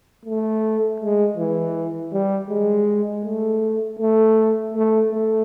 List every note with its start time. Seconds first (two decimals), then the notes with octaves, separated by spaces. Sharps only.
0.25 A3
1.00 G#3
1.37 E3
2.13 G3
2.50 G#3
3.25 A3
3.99 A3
4.74 A3
5.12 A3